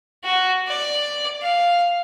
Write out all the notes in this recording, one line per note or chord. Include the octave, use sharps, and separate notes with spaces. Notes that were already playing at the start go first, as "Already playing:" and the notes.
F#4
D5
F5